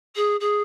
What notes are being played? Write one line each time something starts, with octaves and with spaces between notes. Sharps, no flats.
G#4
G#4